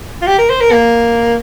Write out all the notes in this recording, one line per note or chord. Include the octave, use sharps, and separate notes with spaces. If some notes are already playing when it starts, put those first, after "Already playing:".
F4
G4
A#4
C5
A#4
A#3